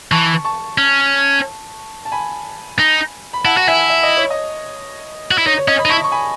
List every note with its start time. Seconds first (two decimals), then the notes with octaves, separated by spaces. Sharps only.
0.12 E3 A5 C#6
0.45 A5 C#6
0.78 C#4
2.05 A5
2.12 G#5 B5
2.79 D#4
3.33 B5
3.45 E4 F#5 A5
3.57 F#4 F#5
3.67 E4 E5 G#5
3.90 E5
4.03 D#5
4.17 C#5
4.30 D#5
5.31 F#4
5.38 E4
5.45 D#4 C#5
5.58 C#5
5.68 C#4 D#5
5.79 B5
5.85 D#4
5.89 E4 A5 C#6
6.04 C#6
6.12 G#5 B5